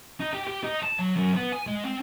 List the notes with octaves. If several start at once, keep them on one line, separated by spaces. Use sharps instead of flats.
D#4
G4
G4
D#4
A5
F#3
F#2
B3
G#5
G#3
C4